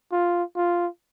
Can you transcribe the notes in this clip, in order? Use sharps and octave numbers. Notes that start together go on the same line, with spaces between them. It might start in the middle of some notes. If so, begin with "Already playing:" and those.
F4
F4